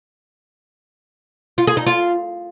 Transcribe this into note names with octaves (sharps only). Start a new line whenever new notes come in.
F4
G#4
D#4
F4